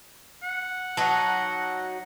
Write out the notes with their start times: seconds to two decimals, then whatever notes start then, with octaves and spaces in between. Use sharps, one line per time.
0.43 F#5
0.97 F#3 D#4 A5